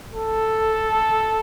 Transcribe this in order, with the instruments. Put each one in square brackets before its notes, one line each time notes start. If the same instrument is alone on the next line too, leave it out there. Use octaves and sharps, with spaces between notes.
[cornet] A4